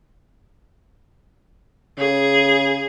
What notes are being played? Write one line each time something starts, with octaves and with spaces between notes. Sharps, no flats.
C#3 G#4